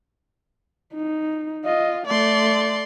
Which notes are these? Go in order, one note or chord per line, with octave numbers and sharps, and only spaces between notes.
D#4
F4 D#5
A3 D5 C6